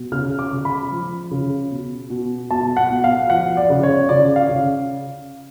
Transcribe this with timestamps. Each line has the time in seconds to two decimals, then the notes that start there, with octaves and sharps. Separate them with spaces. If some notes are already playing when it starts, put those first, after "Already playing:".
Already playing: B2
0.12 C#3 F6
0.39 D6
0.51 C#3
0.65 B5
0.92 F3
1.31 C#3
1.71 B2
2.10 B2
2.50 B2 A5
2.77 F#5
2.91 B2
3.04 F5
3.30 F3 F#5
3.57 D5
3.70 C#3
3.83 C#5
4.09 C#3 D5
4.36 F5
4.49 C#3